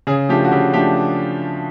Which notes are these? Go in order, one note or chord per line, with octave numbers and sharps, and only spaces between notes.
C#3 G#4
F3 A3 D4 G4
F#4
C#3 G4
F3 A3 D4 G4